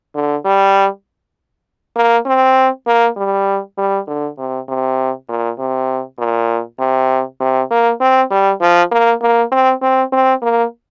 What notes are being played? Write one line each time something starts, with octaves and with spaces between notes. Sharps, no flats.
D3
G3
A#3
C4
A#3
G3
G3
D3
C3
C3
A#2
C3
A#2
C3
C3
A#3
C4
G3
F3
A#3
A#3
C4
C4
C4
A#3